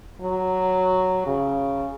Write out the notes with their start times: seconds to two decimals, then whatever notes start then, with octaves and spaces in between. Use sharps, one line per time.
0.22 F#3
1.27 C#3